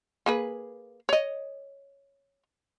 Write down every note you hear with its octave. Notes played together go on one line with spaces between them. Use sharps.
A#3 G#4 B4
C#5 D#5